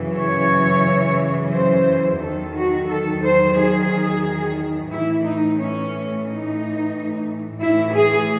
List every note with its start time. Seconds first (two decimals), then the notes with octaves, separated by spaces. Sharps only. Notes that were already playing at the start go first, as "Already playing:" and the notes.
Already playing: F#2 C#3 E3
0.18 C#5
1.53 C5
2.20 E2 D#3 F#3 A4
2.54 F#4
2.88 A4
3.22 C5
3.55 G#4
4.90 A2 E3 E4
5.24 D#4
5.58 C#4
6.25 D#4
7.60 A2 E3 E4
7.94 G#4